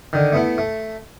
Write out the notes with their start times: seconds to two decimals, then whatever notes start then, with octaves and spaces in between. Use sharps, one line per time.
0.13 D3 D#3
0.32 A3 B3 E4
0.58 A3